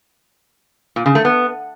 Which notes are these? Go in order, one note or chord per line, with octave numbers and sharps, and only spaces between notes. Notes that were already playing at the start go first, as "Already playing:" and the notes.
A#2
C#3
A3
B3